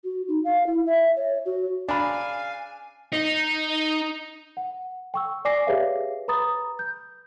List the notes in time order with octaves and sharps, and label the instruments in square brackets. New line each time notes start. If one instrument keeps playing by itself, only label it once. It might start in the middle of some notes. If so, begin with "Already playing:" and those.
[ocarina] F#4
D#4
F5
E4
E5
C#5
F#4
[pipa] C#3 A#5 B5 [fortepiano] D4 [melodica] F5 [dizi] G#5
[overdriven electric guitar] D#4
[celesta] F#5
G5 C#6 E6
D5 G#5 D6 A#6 C7
G4 G#4 B4 C#5 E5 F5
B4 A#5 B5 D#6 A6
G6